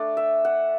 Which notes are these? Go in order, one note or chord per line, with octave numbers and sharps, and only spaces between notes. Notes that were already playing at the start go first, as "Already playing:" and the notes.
Already playing: A3 D4 D5
E5
F#5